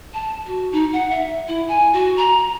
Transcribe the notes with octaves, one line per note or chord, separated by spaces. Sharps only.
A5
F#4
D#4
F#5
E5
E4
G#5
F#4
A#5